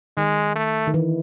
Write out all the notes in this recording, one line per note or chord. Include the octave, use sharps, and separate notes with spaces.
D#3 G#3
A3
D#3
E3